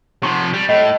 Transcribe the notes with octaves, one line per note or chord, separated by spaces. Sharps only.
C3 F3 C#6
G3
A2 D#5